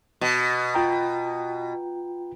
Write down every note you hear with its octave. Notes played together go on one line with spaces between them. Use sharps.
B2
F4 G5 A#5